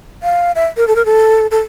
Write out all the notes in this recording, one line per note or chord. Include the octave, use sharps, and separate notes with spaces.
F5
E5
A#4
A4
A#4
A4
A4